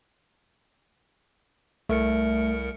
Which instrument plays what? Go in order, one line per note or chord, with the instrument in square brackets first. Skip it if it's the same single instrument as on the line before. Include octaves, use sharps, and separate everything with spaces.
[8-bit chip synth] C2 A#4 C#7 [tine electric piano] A3